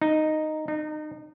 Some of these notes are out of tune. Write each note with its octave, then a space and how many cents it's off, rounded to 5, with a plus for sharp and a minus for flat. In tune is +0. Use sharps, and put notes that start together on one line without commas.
D#4 -5
D#4 -30